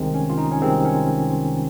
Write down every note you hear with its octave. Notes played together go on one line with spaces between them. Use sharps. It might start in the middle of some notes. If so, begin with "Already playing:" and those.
Already playing: C2 C3 D#3 G#3 C4
C#4
F4
D#4
C#4
C2 C3 D#3 G#3 C4
C#4